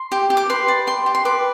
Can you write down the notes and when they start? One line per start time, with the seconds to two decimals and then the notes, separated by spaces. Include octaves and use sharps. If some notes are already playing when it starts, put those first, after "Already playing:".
Already playing: C6
0.12 G4
0.30 G4
0.37 D6
0.49 B4 C6
0.68 D5
0.87 G4 C6
1.06 G4
1.15 C6
1.25 B4 D6